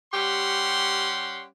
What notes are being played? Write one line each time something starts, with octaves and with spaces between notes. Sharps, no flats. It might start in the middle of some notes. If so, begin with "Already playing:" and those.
G3 C#4 G4 F#5 C6